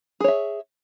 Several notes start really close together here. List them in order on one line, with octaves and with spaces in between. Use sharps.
G#4 C#5 E5